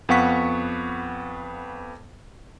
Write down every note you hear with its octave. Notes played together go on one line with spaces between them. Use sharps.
F2 B3 F5 F#5 C#6 B6